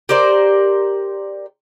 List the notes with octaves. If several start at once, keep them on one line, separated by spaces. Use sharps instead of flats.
G4 A#4 C5 D5